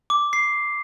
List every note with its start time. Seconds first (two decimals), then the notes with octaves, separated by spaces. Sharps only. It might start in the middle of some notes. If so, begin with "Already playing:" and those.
0.10 D6
0.33 C7